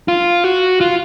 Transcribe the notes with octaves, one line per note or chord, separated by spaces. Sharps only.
F4
F#4
F4